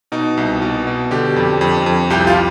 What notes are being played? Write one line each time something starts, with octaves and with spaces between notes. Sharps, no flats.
B2 D#4
C2
B2
B2
D3 G4
F2
F2
F2
C2 G4
F4